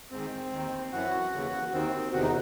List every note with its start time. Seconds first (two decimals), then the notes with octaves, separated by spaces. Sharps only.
0.11 G#2 D#3 C4
0.53 D#2 D#3
0.92 F#2 E3 F#4
1.33 D#2 C#3 E3
1.72 D#2 D#3 C4
2.12 E2 C3 D#3 F#4
2.23 D#4